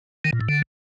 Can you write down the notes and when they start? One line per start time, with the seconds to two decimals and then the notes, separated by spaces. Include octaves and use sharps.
0.25 D#3
0.33 A#2
0.41 A2
0.49 D3